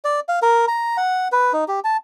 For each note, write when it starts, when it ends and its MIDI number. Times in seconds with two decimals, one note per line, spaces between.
0.05 0.20 74
0.29 0.39 77
0.42 0.65 70
0.68 0.97 82
0.97 1.28 78
1.32 1.53 71
1.53 1.64 63
1.68 1.80 67
1.84 1.97 81